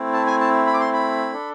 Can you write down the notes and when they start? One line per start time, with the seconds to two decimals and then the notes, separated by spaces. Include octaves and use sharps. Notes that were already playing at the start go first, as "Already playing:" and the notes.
Already playing: A3 C4 E4
0.13 A5
0.26 G#5
0.40 A5
0.66 B5
0.74 D6
0.80 C6
0.93 B5
1.33 D4 A4